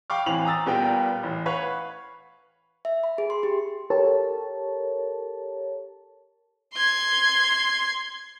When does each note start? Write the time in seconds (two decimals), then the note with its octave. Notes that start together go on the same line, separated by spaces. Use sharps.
0.10 F5 G5 B5 C#6 D6 F6
0.26 A1 E3 C4 F7 F#7
0.45 A#5 D#6 E6 A6
0.66 A#2 G3 B3 A#4 G5
1.23 A1
1.46 B4 C#5 F5 F#5 C#6
2.85 E5
3.04 B5
3.18 G#4
3.30 C6
3.43 G4
3.90 G4 A4 A#4 C#5 A5
6.74 C6 G#6